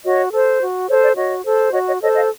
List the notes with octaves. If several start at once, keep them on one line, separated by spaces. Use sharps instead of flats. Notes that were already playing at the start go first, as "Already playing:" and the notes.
F#4 C#5 D#5
A4 C5
F#4
A4 C5 C#5
D5
F#4 C#5 D#5
A4 C5
F#4 C#5 D#5
C#5 D#5
A4 C5 C#5 D#5
D#5 F5